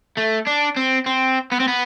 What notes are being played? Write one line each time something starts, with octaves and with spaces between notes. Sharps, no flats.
A3
D4
C4
C4
B3
C4
B3